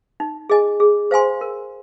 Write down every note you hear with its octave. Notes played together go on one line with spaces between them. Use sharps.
D#4
G#4 D#5 G#5
G#4
C5 F5 G#5 C6
A#4